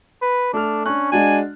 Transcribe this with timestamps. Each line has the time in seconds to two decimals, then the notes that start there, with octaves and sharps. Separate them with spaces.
0.22 B4
0.54 A3 D4 F6
0.86 C#4 D4 F#6
1.12 G#3 D4 F#4 G#5